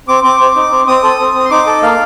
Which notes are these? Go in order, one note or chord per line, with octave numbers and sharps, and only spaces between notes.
C4 D6
C4 D6
C4
D#4
C4
C4 D#6
A4
C4
C4
C6
D#4 D6
A4
A#3 F5